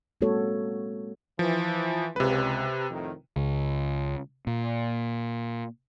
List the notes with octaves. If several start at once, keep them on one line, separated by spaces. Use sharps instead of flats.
G#3 A#3 C4 F#4 A4 C#5
E3 F3
C#2 C3 B4
F2 A2 D#3
C#2
A#2